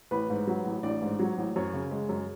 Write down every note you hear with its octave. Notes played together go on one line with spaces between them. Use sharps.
A1 B4 B5
G#2
F#3
A1
A1 D4 D5
G#2
F#3 C#5
A1
F#2 C#5
C#3
G#3
F#2